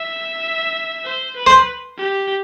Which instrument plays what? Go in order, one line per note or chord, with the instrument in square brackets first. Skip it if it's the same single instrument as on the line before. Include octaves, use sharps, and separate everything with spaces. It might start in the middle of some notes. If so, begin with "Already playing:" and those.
Already playing: [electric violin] E5
C5
B4
[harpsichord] C5
[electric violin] G4